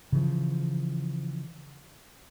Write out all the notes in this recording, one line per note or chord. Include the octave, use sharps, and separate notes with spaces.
C#3 E3 F3